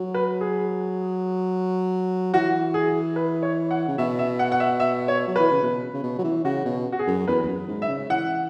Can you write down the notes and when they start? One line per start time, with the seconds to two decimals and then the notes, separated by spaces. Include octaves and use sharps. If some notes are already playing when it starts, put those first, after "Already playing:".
Already playing: F#3
0.14 B4
0.41 G#4
2.34 E3 F#4
2.74 G#4
3.16 B4
3.43 C#5
3.71 F#5
3.88 C#3
3.98 B2 E5
4.19 E5
4.39 F#5
4.52 F#5
4.60 E5
4.80 E5
5.08 C#5
5.27 F#3
5.36 E3 B4
5.51 C#3
5.63 B2
5.94 C#3
6.03 B2
6.18 F#3
6.24 E3
6.45 C#3 F#4
6.65 B2
6.92 F#4
6.99 G#4
7.07 F#2
7.28 E2 B4
7.43 E2
7.48 F#2
7.68 G#2
7.82 E5
7.88 C#3
8.09 E3 F#5